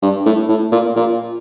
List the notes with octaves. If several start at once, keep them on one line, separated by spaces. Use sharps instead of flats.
G2
A2
A2
A#2
A#2